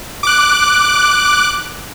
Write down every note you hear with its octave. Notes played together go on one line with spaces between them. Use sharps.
D6 F#6